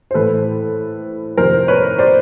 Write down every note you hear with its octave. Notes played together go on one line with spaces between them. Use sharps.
C5
A2 E3 A4 B4
F2 C3 D#3 A#4 C5
B4 C#5
C5 D5